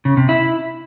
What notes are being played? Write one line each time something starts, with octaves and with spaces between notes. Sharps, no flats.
C#3
C3
E4